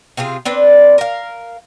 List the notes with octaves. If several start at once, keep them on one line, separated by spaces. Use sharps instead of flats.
C3 C4 F4 G#4
C4 D4 B4 D5
A#4 F5